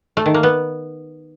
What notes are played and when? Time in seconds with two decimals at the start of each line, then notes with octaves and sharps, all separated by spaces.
0.17 A3
0.26 D#3
0.34 A#3
0.43 B3